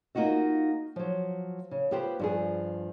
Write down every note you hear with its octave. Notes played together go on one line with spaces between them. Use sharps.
A#3 D#4 F4 F#4 D#5
F3 F#3
C#3
B3 F4 G4 B4 C5
G2 F3 G#4